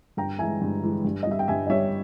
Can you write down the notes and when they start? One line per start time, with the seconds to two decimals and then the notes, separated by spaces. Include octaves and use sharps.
0.17 G2 G5 A#5
0.39 E3 G#3 E5 G#5
0.62 G2
0.83 E3 G#3
1.05 G2
1.23 D#5
1.27 G3 E5
1.39 G5
1.48 G2 E5 G#5
1.67 D#5
1.70 G3 C#5 E5